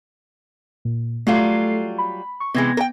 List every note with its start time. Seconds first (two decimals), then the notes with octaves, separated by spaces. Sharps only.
0.85 A#2
1.27 F#3 G3 A3 F4 A4 C7
1.98 B5
2.40 C#6
2.54 C3 E3 G#3 B3 G#6 A#6
2.77 A#4 G5